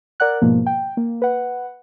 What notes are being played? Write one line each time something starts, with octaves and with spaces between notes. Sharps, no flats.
A#4 D5 F#5 F#6
G#2 B2 F3 A#3
G5
A#3
B4 F#5